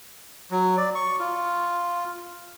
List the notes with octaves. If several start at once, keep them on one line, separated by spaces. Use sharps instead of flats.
F#3
D5
C#6
F4